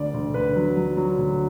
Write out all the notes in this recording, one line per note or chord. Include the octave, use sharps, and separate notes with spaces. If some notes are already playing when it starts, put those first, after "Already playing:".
Already playing: D2 D5
D2
D2 B4
F#3
F#3
F#3
D2